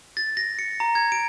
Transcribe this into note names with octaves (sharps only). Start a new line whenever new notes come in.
A6
A#6
C#7
A#5
G#6
D7